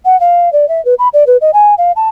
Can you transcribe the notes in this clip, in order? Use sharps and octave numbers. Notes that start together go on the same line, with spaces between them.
F#5
F5
D5
E5
B4
B5
D5
B4
D#5
G#5
F5
A5